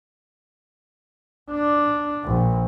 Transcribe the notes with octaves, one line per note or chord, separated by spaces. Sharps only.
D4
A#1